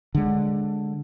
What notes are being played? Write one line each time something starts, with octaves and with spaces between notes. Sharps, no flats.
D3 G#3